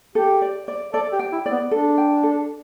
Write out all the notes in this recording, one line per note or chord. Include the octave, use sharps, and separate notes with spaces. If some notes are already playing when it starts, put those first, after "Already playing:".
G4 A4
D5
D5
A4 D5
G4
G5
E4
D5
B3
D4 A4
G5
A4